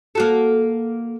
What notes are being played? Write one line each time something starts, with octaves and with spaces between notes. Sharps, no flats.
A#3 F#4 A4